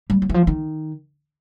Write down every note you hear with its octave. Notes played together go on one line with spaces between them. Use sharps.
G3
F#3
E3
F3
D#3